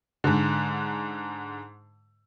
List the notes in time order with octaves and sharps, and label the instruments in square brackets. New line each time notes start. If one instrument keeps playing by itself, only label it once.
[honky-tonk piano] G#2 D3